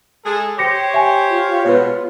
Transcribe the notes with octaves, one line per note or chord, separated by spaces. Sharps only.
G#3 G#4 A4
G4 C5 C#5 D6 A#6 C#7
E5 G#5
F4
B2 G#3 B3 F4 B4 C#5